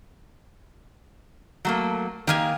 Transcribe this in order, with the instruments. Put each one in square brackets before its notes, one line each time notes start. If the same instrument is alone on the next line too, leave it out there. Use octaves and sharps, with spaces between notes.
[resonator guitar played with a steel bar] F#3 A3 A#3
[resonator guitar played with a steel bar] D#3 A#3 [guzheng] G4 F5 G#5